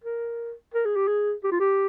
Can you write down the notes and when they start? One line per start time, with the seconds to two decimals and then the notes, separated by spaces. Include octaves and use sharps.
0.04 A#4
0.74 A#4
0.85 G#4
0.96 G4
1.07 G#4
1.44 G4
1.51 F4
1.60 G4